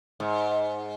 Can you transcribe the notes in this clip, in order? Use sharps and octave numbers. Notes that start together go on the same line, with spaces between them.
G#2